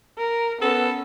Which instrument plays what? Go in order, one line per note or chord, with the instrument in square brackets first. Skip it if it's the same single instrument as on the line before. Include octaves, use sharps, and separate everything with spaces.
[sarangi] A#4
[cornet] B3 [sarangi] C#4 [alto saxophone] A4